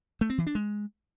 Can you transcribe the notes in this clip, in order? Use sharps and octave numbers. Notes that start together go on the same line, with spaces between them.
A3
C4
E3
D4
G#3